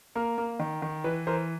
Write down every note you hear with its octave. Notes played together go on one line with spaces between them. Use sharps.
A#3 A#4
A#3
D#3
D#3
E3 B4
E3 A#4 C5